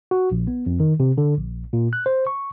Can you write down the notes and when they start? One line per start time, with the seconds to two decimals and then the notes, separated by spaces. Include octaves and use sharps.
0.11 F#4
0.32 A#1
0.47 B3
0.66 F2
0.80 D#3
1.00 C3
1.18 D3
1.38 A#1
1.73 A#2
1.93 F#6
2.06 C5
2.27 C#6